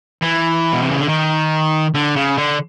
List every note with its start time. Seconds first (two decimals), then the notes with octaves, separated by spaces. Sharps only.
0.22 E3
0.73 B2
0.82 C3
0.91 C#3
0.99 D3
1.08 D#3
1.94 D3
2.16 C#3
2.38 D3